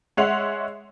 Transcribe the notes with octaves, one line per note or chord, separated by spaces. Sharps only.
G#3 C#5 E5 F#5 C6 F7